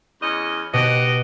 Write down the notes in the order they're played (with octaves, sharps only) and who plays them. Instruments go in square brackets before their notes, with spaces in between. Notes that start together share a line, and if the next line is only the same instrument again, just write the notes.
[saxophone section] E2 C#4 D#5
[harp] B2 [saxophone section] F#4 G4 D#5